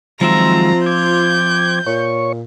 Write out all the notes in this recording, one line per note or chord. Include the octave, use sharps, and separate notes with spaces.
D#3 F3 F#3 G#3 C4 F4 E5 A#5
D6 G6 G#6
A#2 C#5 C#6